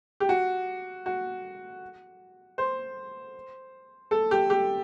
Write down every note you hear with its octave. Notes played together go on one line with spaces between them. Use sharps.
G4
F#4
F#4
C5
A4
G4
G4